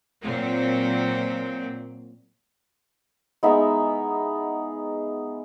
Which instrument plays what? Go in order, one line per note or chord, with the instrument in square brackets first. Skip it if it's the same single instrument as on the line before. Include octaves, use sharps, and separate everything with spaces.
[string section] A#2 F#3 C4
[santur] G#3 B3 D#4 E5